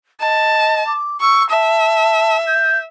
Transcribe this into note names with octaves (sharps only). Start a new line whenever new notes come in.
D#5 A5
D6
C#6 E6
E5 A5
G6